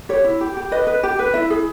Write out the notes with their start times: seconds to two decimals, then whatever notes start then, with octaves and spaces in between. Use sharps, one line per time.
0.09 G4 C#5
0.24 E4
0.41 G4
0.57 G4
0.71 B4 D#5
0.87 B4
1.03 G4
1.19 B4
1.34 E4 E5
1.50 G#4